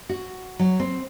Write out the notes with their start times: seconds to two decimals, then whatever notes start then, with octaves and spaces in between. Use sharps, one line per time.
0.09 F#4
0.59 F#3
0.80 C4